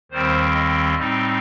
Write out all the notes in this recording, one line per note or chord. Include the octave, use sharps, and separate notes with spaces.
D#2 D#3 G3 C4 C5
D#5
A2 G3 C4 D#4